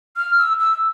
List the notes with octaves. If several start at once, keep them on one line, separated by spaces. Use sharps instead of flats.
F6
E6
E6